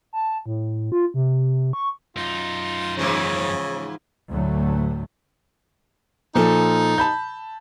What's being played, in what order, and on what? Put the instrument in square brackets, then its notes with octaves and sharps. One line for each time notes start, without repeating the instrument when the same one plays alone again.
[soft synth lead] A5
A2
F4
C3
C#6
[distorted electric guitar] F#2 D#4 [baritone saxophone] F4
[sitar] G#2 E3 F3 [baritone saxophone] C#3
[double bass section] D2 A2 F#3 A3
[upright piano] A#2 F3 A4 [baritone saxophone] D#4
[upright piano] A5 B5 G6